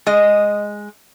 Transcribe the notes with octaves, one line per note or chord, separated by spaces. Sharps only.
G#3 D#5